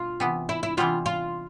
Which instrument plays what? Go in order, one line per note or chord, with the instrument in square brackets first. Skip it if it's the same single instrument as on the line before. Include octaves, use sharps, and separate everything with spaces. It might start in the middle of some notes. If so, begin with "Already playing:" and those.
Already playing: [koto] B2 [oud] F4
[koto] C3 E3 B3
[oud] E4
E4
[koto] C3 E3 G3 B3 [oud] F4
[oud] F4